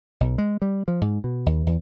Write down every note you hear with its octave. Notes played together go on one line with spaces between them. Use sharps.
B1
G#3
G3
F3
G#2
B2
D#2
E2